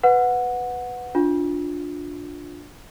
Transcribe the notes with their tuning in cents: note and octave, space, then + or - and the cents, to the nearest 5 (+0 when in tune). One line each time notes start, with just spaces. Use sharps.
B4 +10 F#5 -15
D4 +0 F4 +20